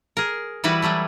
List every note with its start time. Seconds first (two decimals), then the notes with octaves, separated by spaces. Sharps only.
0.17 G#4 A#4
0.64 E3 G3 E4 F#4 B4
0.82 E3 F#3 G3 A3